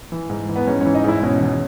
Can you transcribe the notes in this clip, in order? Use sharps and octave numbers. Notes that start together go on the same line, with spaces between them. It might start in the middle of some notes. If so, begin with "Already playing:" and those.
E3
G#2
E3
B3
G#2 C#4
E3 C#4
D#4
G#2 E4
B2 C#4
E2